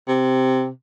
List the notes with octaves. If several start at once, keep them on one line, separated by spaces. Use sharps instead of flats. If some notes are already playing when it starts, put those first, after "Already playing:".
C3